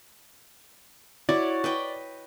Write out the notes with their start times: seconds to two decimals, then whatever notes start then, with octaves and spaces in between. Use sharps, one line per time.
1.29 E4 F#4 C#5 D5
1.64 B4 D#5 G5